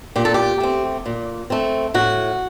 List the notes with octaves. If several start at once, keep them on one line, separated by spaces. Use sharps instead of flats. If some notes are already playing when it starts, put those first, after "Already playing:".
A#2 G4
A4
G4
A3 C4
A#2
A3 C4
A2 F#4